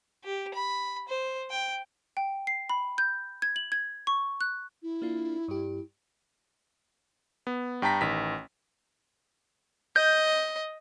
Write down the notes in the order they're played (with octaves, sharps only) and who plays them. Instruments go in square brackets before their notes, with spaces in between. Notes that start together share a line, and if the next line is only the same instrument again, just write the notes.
[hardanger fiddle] G4
B5
C5
G5
[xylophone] G5
C7
B5
G6
G#6
F#7
G#6
C#6
F#6
[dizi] E4
[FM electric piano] A#3 D4 F4
G2 G4
[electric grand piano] B3
G2 G5 A5 A#5 B6
A1 D#3 B6
[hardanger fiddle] D#5 [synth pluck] G6